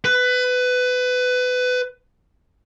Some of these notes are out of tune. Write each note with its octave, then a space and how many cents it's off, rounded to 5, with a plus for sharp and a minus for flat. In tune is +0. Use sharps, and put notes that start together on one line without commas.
B4 +20